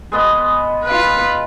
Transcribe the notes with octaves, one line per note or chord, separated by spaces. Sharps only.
G#3 B3 D#5
F4 B4